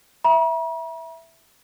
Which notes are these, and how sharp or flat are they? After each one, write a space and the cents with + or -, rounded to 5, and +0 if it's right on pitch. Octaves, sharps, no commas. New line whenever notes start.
E5 +0 A#5 +45